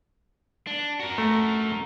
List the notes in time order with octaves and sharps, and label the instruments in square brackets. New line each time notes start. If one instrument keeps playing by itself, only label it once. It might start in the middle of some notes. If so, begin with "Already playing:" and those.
[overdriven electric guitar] D4
F#4 A#4
[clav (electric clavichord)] A3